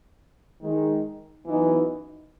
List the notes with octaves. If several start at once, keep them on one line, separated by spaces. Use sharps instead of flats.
D#3 G#3 D#4
F#2 E3 B3 D#4